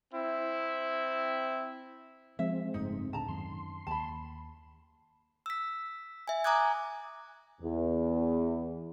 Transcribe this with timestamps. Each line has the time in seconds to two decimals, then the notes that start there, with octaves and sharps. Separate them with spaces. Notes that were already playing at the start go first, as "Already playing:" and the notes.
0.14 C4 E4
2.39 F3 G#3 C4 E5
2.74 F#1 G#2 A3 D#4
3.13 D1 A2 D3 A5 A#5
3.28 F#2 D#3 C6
3.87 D#2 A5 B5
5.46 E6 B6
6.28 E5 G#5
6.44 G#5 A#5 D6 D#6 F#6 G#6
7.62 E2